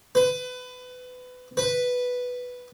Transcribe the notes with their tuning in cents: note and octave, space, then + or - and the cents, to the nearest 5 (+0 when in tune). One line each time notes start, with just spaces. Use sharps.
B4 +25
B4 +0